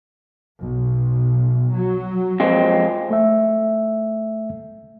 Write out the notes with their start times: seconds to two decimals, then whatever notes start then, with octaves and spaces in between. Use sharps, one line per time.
0.59 B1
1.74 F#3
2.40 F2 G#3 C4
3.10 A3 E5